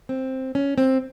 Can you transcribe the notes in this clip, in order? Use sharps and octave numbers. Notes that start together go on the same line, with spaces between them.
C4
C#4
C4